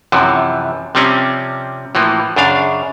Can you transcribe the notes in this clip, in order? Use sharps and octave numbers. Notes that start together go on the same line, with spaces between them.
F#2 C3 E3 F3
C3 F3 G3 C4 C#4
A2 E3 F3 A#3
F#2 C#3 D4 F5